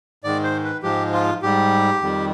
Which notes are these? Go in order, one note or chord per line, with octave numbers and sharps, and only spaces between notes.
G#2 D#3 G#3 D5
C5
B4
G#2 F3 G#3 G4
F4
G#2 G3 G4
F2 D#3 G3